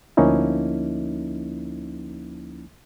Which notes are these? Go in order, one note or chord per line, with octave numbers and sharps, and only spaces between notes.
D2 F3 A#3 C#4 D#4 E4